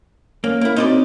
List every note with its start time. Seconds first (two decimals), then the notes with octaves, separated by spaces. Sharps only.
0.44 A#3 C#4 C#5
0.61 A#3 E4
0.76 C4 D#4 F#4 C5 D5